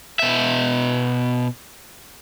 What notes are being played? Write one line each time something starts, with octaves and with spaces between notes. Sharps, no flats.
B2 E5